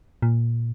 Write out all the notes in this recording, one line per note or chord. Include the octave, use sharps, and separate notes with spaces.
A#2